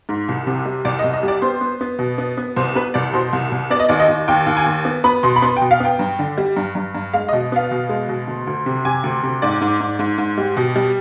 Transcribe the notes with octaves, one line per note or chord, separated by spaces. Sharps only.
G#2
C2
C3
G3
C2 D5
D#5
C2
D#5
G3 D5
B3 C5
B3
B3
B2
B3
B3
C2 C5
B3 B4
C2 D5
B2 C5
C2
C2
B3 D5
D#5
D#2 D5
D#5
D#2
D#2 G5
D#2
G#5
D#2
B3
B3 B5
B2 C6
B5
B3 C6
G5
B2
F5
B3 G5
G2
D3
G3
G2
G2
G2
G#3 F5
D#5
B2
B3 F5
B2
G#3
B2
D2
D2
C3
C3 G#5
D2
C3
G#2 D5
G#2
G#2
G#2
G#2
G3
B2
G3